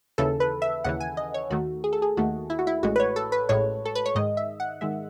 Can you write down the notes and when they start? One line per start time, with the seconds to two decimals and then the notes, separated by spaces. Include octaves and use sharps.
0.18 D#2 C#3 E3 A4
0.40 B4
0.62 E5
0.84 D#2 C#3 E3 F#5
1.00 G#5
1.17 D#5
1.34 C#5
1.50 D#2 D#3 A3 F#4
1.84 G#4
1.93 A4
2.02 G#4
2.17 D#2 D#3 A3 F#4
2.50 E4
2.59 F#4
2.67 E4
2.83 A1 A2 G#3 F#4
2.96 B4
3.00 C#5
3.16 A4
3.32 B4
3.49 A1 A2 G#3 C#5
3.85 A4
3.95 B4
4.06 C#5
4.15 G#2 D#3 G#3 D#5
4.37 E5
4.60 F#5
4.81 D#3 G#3 E5